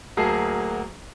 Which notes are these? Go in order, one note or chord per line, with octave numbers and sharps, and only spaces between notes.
D2 F#3 A#3 G#4 A5 C7